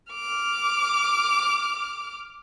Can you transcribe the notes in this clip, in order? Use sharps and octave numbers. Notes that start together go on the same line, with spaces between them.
D6 F6